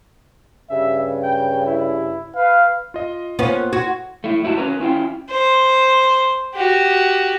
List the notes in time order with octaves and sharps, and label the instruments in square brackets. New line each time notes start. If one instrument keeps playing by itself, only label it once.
[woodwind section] G2 C#3 [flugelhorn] E5
[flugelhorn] G5
E4
[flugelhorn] B4 [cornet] F5
[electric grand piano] F4 D#5
[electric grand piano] A#3 F4 C5 [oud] B3 C#4
[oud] F#4 [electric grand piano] C6 C#6 G#6
[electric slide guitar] A3 E4
F#2 A3 E4 F#4 A5
C#4 A#4 B4 A#5
C#4 E4 F4 G5
[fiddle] C5
F#4 G4